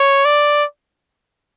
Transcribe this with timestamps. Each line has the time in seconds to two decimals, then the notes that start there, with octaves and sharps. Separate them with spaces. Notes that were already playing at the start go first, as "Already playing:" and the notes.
Already playing: C#5
0.25 D5